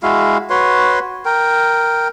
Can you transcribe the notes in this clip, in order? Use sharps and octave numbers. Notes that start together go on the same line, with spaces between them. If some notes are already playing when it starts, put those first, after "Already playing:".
G#3 E4 F#4 F5
F#4 B4 C#5 C6
A#4 G5